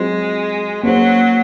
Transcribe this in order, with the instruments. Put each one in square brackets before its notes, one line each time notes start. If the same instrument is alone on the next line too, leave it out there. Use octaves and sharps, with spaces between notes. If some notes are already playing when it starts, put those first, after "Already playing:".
Already playing: [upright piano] F#3 C4 F4 C5 [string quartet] G#3
[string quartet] F#3 [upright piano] A#3 C#4 G#4 C5